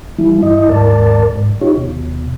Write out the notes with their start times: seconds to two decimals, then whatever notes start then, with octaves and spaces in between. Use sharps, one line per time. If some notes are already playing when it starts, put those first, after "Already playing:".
0.18 E3 G3 E4
0.43 G2 E4 D#5
0.69 D#2 G#2 A#4 D5 A5
1.32 G#2
1.61 D#4 F4 G4 C#5
1.77 D#2 B2